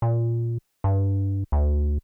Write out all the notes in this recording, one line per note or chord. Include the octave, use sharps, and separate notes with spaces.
A#2
G2
D2